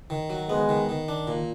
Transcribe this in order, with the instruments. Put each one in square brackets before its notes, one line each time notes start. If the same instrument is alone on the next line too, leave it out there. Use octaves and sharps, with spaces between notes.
[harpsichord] D#3
F#3
[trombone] G#3 [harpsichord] B3
[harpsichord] D#3
D#3
D4
A#2